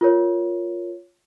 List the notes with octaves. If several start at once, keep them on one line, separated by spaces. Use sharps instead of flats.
F4 A#4 C#5